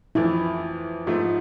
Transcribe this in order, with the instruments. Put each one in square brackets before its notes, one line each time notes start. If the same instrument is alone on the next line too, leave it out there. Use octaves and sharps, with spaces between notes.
[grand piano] F2 E3 A3 [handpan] E4
[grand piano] G#2 F3 A3